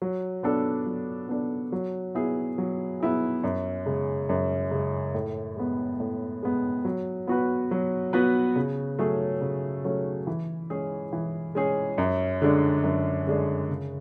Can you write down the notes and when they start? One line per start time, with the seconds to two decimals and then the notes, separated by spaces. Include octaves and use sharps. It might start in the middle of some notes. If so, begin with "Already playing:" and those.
0.02 F#3
0.43 B3 D4 A4
0.86 F#3
1.29 B3 D4 A4
1.72 F#3
2.15 B3 E4 G#4
2.58 F#3
3.00 B3 E4 G#4
3.44 F#2
3.86 C#3 G#3
4.29 F#2
4.71 C#3 G#3
5.14 A2
5.57 G#3 B3
6.00 A2
6.43 G#3 B3
6.85 F#3
7.27 B3 F#4 B4
7.71 F#3
8.13 B3 F#4 B4
8.56 C#3
8.99 F#3 A3 C#4 G#4
9.41 C#3
9.84 F#3 A3 C#4 G#4
10.27 E3
10.70 G#3 C#4 G#4
11.13 E3
11.55 G#3 C#4 G#4
11.98 F#2
12.42 D3 G#3 D4
12.84 F#2
13.27 D3 G#3 D4
13.70 C#3